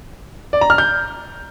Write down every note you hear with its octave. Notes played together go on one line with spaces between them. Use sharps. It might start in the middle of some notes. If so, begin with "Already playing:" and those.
D5
A#5
F6
G6